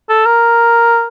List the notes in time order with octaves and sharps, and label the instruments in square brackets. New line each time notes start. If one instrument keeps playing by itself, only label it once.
[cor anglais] A4
A#4